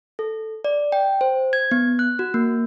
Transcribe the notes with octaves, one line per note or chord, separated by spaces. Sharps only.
A4
D5
G5
C5
G#6
B3
F#6
F#4
A#3